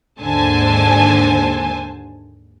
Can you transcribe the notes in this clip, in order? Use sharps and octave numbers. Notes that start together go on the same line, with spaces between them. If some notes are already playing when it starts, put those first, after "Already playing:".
D#2 G#2 D3 C5 G#5 A5